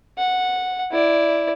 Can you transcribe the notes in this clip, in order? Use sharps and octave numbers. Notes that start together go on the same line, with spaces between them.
F#5
E4 D5